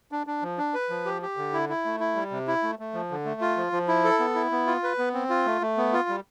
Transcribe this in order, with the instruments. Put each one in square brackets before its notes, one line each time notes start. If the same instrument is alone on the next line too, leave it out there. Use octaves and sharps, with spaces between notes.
[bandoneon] D4
D4
F3
D4
B4
F3
G4
G4
D3
E4
E4
A3
E4
G3
C3
E4
A3
A3
F3
D3
A3
F4
F3
F3
E4
A4
B3
E4
B3
F4
B4
B3
C4
F4
A3
A3
B3
F4
G3